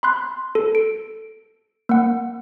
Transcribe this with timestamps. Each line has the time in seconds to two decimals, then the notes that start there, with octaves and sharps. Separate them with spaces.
0.03 B5 C6 F#6
0.55 A4
0.75 D7
1.89 A#3 F#5